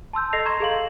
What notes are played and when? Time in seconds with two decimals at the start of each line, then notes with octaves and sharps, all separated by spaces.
0.13 A5 C6 E6 G6
0.33 A4 D#5 A#6 C7 F7
0.45 A#5 C6 C#6 G#6 E7
0.60 G#4 A4 F5 F#7